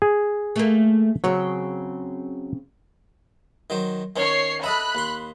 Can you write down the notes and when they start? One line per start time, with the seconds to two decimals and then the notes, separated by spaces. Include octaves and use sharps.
0.02 G#4
0.56 A3 A#3
1.24 C#3 F#3 C4 C#5
3.70 D#3 F#3 C5
4.16 D#3 C#4 C#5 C7
4.64 A4 D#5 E5 B5 F#6
4.95 D#2 C6